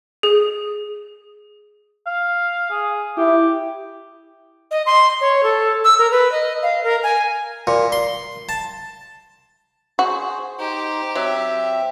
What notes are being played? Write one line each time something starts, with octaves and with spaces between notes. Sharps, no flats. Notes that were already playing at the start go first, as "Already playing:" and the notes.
G#4
F5
G#4
E4 G4
D#5
C6
C#5
A4
E6
A#4
B4
D#5
F5
A#4
G#5
A#2
C6
A5
F#4 G#4 C5
D#4 G4 C5
F#3 C4 E5